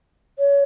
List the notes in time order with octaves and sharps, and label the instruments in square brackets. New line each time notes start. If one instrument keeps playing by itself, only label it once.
[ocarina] C#5